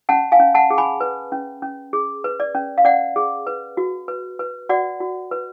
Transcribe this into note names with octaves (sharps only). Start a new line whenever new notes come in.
C#4 F#5 A5
F5 G#5
C#4
F#5 A5
G#4
G#5 B5
B4
C#4
C#4
G#4
B4
D5
C#4
F5
C#4 D5 F#5
G#4
B4
F#4
B4
B4
F#4 D5 F#5
F#4
B4